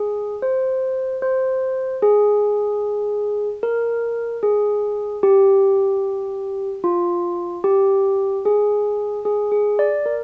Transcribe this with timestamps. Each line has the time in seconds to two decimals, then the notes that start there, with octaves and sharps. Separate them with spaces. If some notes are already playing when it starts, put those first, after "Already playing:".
Already playing: G#4
0.42 C5
1.22 C5
2.02 G#4
3.63 A#4
4.43 G#4
5.23 G4
6.84 F4
7.64 G4
8.45 G#4
9.25 G#4
9.52 G#4
9.79 D5
10.06 A#4